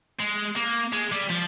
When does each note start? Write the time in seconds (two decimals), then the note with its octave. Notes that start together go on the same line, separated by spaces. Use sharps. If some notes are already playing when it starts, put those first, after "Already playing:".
0.19 G#3
0.56 A#3
0.92 G#3
1.12 G3
1.30 F3